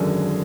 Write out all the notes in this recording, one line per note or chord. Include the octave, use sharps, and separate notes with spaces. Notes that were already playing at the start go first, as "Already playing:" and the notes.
Already playing: G#1 F#2 D3 G#4 A#4